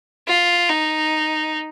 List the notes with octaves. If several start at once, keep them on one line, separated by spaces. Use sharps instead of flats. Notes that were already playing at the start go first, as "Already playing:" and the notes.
F4
D#4